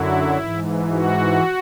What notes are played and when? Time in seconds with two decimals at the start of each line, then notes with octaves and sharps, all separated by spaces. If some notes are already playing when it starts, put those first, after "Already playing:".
Already playing: F#2 D3 F#3 E4
0.38 G#2 E3
0.91 F#4